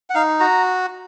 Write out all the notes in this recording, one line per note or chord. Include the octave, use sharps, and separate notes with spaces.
F#5
D#4 F5
F#4 A#5